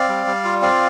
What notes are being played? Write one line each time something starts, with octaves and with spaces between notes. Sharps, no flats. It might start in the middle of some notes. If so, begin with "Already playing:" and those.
Already playing: C4 D5 F5
G3
G3
F4
C4 D5 F5